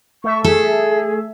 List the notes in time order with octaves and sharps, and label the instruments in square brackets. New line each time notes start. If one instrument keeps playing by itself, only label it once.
[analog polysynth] A3 E5 [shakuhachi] C#6
[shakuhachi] G#4 [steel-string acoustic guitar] A4